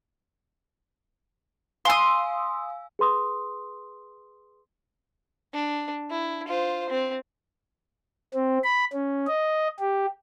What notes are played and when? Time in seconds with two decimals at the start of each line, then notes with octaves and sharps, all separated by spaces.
1.85 F5 G#5 C6 D#6 E6
2.99 G#4 B4 C6 D#6
5.54 D4
6.11 E4
6.48 F4 C5
6.90 C4
8.34 C4
8.64 B5
8.94 C#4
9.27 D#5
9.79 G4